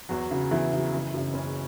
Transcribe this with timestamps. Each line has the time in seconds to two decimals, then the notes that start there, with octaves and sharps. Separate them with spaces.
0.09 E2 F#3 F#4
0.31 C#3 F#3
0.51 E2 E3 E4
0.72 C#3 F#3
0.92 F#1 E3 E4
1.14 F#2 C#3
1.34 F#1 C#4